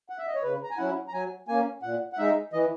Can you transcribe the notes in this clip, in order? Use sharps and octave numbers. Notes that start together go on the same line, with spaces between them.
F#5
E5
D#5
C#5
C#3 B4
A#5
G#5
F#3 C#4 E4 F#5
A#5
F#3 G#5
A#3 C#4 G#5
A#2 F#5
F#5
G#3 D#4 E5
E3 D#5